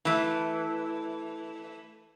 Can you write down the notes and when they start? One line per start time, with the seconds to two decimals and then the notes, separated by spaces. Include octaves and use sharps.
0.05 E3 A3